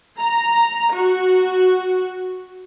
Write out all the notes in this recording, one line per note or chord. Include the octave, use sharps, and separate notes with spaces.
A#5
F#4